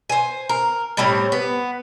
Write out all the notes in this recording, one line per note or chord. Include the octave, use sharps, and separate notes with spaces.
C5 G#5
A#4
A2 G3 C4 C#5
B3